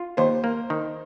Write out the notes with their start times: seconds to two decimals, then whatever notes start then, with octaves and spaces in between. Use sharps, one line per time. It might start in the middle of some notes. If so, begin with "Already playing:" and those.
Already playing: F4
0.17 D#2 C5
0.44 A#3
0.70 D#3